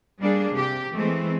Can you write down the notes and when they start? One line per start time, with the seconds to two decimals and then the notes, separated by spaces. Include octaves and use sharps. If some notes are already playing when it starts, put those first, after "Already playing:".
0.20 G3 A#3 D4 G#4
0.54 C3 G4
0.93 E3 G#3 A3 C4